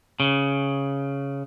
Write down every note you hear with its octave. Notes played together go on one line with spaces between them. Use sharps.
C#3